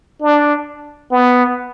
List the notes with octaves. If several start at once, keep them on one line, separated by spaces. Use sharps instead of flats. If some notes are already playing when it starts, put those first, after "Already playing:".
D4
B3